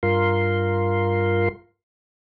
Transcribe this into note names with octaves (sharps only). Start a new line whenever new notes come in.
G2 F4 A#4 C6